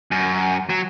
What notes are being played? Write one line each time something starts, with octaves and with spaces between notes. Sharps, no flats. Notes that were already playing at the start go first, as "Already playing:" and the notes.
F#2
F#3